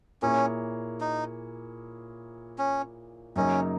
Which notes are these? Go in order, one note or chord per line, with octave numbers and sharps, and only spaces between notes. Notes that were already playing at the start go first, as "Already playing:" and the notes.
A#2 A#3 C#4 E4 G#4 C#5
D#4
C#4
F#2 C#3 F#3 A#3 C#4 D#4